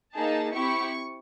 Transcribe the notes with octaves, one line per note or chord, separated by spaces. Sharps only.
A#3 D#4 G#4 A5
C4 E4 G4 C#6